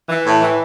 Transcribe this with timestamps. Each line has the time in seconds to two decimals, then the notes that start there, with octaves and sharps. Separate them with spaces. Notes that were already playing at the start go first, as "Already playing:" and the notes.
0.09 E3
0.26 A2
0.41 E3